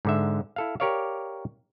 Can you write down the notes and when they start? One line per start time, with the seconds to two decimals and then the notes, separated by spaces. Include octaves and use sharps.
0.05 G#2 D3 E5
0.56 E4 A4 F5
0.80 G4 A#4 C#5 D5 F5